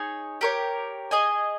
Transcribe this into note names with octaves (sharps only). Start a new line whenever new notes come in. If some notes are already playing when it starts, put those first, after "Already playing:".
Already playing: D#4 G#4 C#5
G4 A#4 C#5
G#4 D#5 G#5